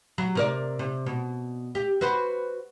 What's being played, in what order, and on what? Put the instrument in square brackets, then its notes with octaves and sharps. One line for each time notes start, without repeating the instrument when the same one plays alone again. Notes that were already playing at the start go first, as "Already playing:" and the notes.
[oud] F#3
C3 A#4 D5
C3
B2
G4
F#4 B4 C5